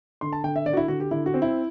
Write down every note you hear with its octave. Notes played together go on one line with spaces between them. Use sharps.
D3 C6
A5
D3 G5
E5
D3 D5
F#4
E4
D3 F#4
G4
D3 E4
F#4
C4
E4